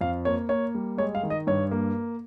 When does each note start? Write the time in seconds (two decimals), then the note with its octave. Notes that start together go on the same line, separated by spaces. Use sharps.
0.01 F2 F5
0.25 A#3 C#5
0.49 A#3 C#5
0.75 G3
0.98 G#3 C#5
1.15 F5
1.23 D#3
1.30 D#5
1.47 G2 C#5
1.71 A#3